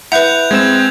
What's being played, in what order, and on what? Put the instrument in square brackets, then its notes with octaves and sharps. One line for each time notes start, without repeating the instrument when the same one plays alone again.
[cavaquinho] E4 [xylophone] B4 F#5 [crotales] F#6 G6 F7
[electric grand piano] G#3 C4 E7 [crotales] G#6